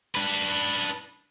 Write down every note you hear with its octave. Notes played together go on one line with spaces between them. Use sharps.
D4 B4